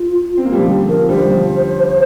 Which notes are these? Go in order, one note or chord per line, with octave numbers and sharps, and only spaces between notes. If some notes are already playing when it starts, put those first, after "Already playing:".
Already playing: F4
C4
A#3
G3
F3
D3 G4
F3 A#4
D3 G3 C5
F3